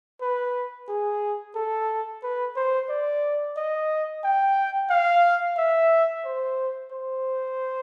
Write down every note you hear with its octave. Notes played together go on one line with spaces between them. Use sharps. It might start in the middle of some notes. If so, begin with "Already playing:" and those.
B4
G#4
A4
B4
C5
D5
D#5
G5
F5
E5
C5
C5